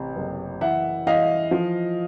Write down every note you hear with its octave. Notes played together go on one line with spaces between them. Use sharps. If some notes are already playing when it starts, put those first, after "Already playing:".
Already playing: A1 C3
F#1
E3 E5 F#5
E3 D#5 F5
F3